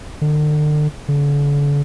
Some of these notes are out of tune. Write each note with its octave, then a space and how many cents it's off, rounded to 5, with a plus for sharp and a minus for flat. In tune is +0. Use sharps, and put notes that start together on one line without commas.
D3 +40
D3 -40